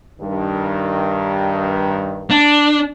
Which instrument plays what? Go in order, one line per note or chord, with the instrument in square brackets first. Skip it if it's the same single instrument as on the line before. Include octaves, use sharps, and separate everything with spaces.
[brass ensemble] G2 D#3
[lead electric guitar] D4